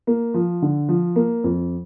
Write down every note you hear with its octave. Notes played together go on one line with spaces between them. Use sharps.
A#3
F3
D3
F3
A#3
F2